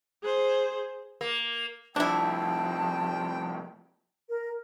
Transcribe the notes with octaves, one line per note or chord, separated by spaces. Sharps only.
G#4 C5
A#3
C2 F3 D4 E4 G5 A5
A#4